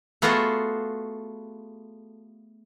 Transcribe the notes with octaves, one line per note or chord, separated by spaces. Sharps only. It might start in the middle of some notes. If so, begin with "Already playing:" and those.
A3 B3 F4 F#4 G#4 A4